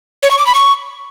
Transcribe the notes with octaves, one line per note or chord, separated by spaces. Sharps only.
C#5
C#6
D6
B5
C#6